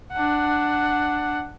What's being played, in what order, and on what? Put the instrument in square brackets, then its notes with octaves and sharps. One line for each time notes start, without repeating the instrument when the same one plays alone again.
[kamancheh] D4 F#5